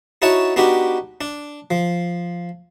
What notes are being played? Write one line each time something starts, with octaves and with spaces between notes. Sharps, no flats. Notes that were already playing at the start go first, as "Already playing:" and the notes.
D#4 E4 F#4 C#5 F#5 A5
B3 D4 D#4 F#4 G4
D4
F3